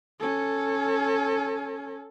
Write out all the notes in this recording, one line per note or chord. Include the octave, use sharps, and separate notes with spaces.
C#4 A4